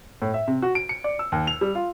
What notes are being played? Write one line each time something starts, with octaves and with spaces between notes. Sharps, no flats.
A2
E5
C3
F#4
D7
C#7
D5
E6
D#2
F7
G3
F4